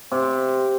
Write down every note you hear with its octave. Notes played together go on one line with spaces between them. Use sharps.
C3